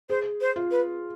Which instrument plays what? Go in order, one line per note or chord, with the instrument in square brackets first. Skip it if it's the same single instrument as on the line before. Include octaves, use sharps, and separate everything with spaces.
[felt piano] G#4 [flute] C5
[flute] C5
[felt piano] F4
[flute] B4